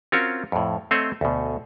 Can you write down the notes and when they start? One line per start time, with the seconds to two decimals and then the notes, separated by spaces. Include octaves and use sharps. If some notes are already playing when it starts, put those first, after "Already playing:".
0.12 C4 C#4 F4 F#4 A#4 C#5
0.52 F2 A2
0.91 A3 C4 C5 C#5 D#5 F#5
1.21 D2 B2